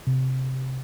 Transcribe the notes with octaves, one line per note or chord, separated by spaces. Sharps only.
C3